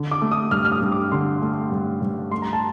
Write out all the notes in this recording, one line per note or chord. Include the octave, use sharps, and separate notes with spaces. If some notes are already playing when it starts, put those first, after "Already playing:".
Already playing: D3
D6
A3
D#6
G2 F6
F6
D#6
G2
D6
D3 C6
A3
G2
G2
A3 C6
A#5
A5